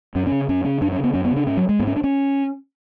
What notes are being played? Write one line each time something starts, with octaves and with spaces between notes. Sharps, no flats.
F#2 C#4
C#3 C#4
F#2 C#4
C#3 C#4
F#2 D4
C#4
C#3
B3
F#2 C#4
B3
C#3
D4
G#2 C#4
F#3
G#3
G#2 B3
C#4
D4
C#4